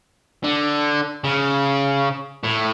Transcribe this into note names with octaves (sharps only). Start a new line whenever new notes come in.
D3
C#3
A2